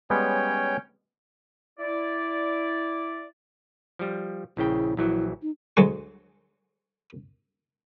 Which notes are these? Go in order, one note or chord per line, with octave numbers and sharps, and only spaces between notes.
G3 G#3 B3 C#4 C#5 G5
E4 D5
F3 G3
A#1 C#3 E4 G5
A#1 E3 F#3 E4
D#4
D2 F#3 G#3 C#6